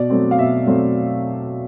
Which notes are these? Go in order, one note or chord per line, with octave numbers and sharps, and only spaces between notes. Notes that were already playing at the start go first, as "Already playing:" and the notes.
Already playing: B2 D5
F#3 A3 C4
F5
B2 E5
F#3 A3 C4